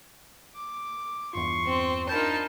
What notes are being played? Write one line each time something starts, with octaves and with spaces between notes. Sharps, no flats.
D6
E2 G2 F4 C6 C#6
C4
D4 D#4 F4 A#4 A5 B5 G6